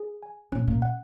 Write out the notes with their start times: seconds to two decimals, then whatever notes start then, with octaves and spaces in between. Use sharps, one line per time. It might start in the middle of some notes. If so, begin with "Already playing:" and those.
Already playing: G#4
0.23 G#5
0.52 A#2 C#4
0.68 A#2
0.82 F#5